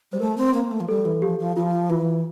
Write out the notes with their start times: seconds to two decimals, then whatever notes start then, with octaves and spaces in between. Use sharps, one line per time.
0.12 G3 C5
0.20 A3 A#4
0.38 C4
0.54 A#3
0.71 A3
0.80 F3
0.88 G3 A4
1.05 E3
1.22 F3 G4
1.39 F3
1.56 F3 F4
1.90 E3 F4